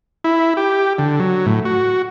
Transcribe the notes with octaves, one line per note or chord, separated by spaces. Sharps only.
E4
G4
D3
F#3
A2
F#4